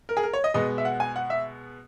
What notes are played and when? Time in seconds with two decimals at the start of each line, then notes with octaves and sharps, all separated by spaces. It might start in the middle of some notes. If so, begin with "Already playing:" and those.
0.09 A#4
0.17 G#4
0.23 A#4
0.33 C#5
0.44 D#5
0.54 B2 G#3 B3 D#5
0.78 E5
0.85 F#5
1.00 G#5
1.16 F#5
1.30 E5